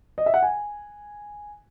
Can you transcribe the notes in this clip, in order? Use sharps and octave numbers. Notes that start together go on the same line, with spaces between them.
D#5
E5
F#5
G#5